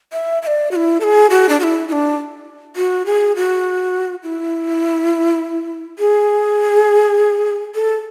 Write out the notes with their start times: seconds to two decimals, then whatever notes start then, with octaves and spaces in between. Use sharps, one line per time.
0.13 E5
0.42 E5
0.47 D5
0.71 F#4
0.76 E4
1.00 A4
1.04 G#4
1.30 F#4
1.49 D4
1.60 F#4
1.63 E4
1.88 E4
1.92 D4
2.76 F#4
3.06 G#4
3.36 F#4
4.23 E4
5.99 G#4
7.75 A4